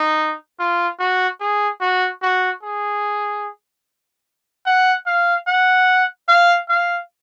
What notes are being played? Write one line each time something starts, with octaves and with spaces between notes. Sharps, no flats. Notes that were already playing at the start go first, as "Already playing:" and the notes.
Already playing: D#4
F4
F#4
G#4
F#4
F#4
G#4
F#5
F5
F#5
F5
F5